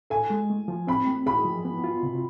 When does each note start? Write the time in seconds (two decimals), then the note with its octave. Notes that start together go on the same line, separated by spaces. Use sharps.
0.10 A4 G#5
0.30 G#3
0.50 A3
0.68 F3
0.87 C4 B5
1.07 A3
1.26 G#4 B5
1.45 F3
1.65 B3
1.84 F4
2.03 C3